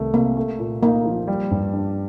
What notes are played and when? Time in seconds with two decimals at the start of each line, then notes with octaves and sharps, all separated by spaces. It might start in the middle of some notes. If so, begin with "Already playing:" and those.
Already playing: C2 D#3 A3
0.14 C3 A#3
0.37 A3
0.59 A#2
0.83 A#3 D#4
1.05 F3
1.28 G3
1.51 G2
1.74 D4